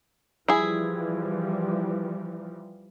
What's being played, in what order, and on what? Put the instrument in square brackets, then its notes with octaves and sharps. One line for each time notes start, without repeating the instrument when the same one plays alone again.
[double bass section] E3 F3 G3 [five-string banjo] E4 G#4